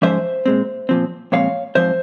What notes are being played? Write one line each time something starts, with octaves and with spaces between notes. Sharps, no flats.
G#2 F3 G#3 C#4 C5 E5
A#2 G#3 C4
A#2 F3 C4
A#2 F3 G#3 C4 C#5 F5
G#2 F3 C4 C5 E5